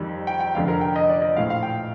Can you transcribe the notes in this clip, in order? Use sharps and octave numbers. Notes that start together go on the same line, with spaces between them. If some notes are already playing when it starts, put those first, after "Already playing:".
Already playing: F2 D#3 G3
G5
G5
F1 F2 D3 F5
A#4
G5
D#5
D5
D#5
A#1 A2 F3 F5
F5
G5